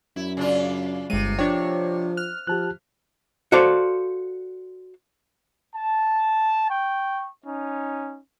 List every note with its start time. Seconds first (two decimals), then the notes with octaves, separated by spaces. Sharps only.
0.16 F#2 E4
0.37 C#3 D4 F4
1.10 G1 C3 G#3 D#7
1.39 F3 D4 C#5 G5
2.17 F6 F#6
2.47 F3 G4 A5 F#6
3.52 F#4 A4 C5 D5 F5
5.75 A5
6.69 G5 C#6
7.45 C#4 D#4